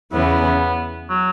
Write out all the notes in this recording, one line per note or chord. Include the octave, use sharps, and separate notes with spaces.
E2 C#3 E3 B3 C#4
F#3